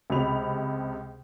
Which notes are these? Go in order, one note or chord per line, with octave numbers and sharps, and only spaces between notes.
C#2 C3 B5 F7